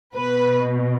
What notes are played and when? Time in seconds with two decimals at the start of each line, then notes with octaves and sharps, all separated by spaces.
0.15 B2 B4